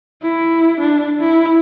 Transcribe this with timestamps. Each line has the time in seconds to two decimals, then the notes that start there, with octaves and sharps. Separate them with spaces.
0.22 E4
0.80 D4
1.20 E4